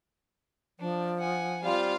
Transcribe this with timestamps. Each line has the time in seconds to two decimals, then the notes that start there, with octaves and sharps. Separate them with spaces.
0.79 F3 D4
1.20 F#5 G#5
1.64 G3 C4 F4 F5